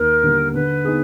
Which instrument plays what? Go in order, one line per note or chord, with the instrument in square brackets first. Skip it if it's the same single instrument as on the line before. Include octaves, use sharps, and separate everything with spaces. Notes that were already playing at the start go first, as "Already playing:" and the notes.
Already playing: [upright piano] D#2 [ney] A#4
[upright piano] D3 G3 A#3
[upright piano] D3 [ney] B4
[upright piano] B3 D#4 G#4